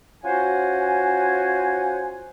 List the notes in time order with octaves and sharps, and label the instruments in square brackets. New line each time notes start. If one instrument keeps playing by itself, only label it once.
[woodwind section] C#4 F4 F#4 C5 F#5 G#5